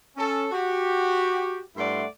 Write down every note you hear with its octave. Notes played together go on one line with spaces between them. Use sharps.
C#4 A4
F#4 G4
G2 A3 E4 D5 F#5 C6